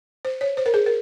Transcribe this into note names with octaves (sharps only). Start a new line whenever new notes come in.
C5
C#5
C5
A#4
G#4
A#4